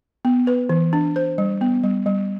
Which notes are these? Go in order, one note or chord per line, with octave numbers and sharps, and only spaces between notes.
B3
B4
E3
D4
C5
G3
B3
G3
G3